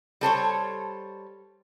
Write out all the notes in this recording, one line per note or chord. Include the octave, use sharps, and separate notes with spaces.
G3 A4 C5 C#5